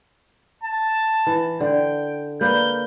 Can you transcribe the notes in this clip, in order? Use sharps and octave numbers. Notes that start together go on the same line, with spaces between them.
A5
E3
D3 G5
A#3 B4 D5 G6